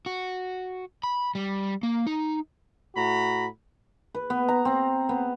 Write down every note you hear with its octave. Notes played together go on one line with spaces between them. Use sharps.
F#4
B5
G3
A#3
D#4
A2 F#4 A#5 B5
B4
B3
A#5
C4
B3